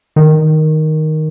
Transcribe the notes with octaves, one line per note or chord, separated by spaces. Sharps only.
D#3